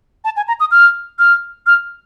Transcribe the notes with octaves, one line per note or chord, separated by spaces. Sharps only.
A5
G#5
A#5
D#6
F6
F6
F6